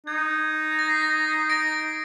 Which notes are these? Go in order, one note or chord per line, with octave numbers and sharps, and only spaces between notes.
D#4 G#6
A#6
C7
A#6
A#6 D7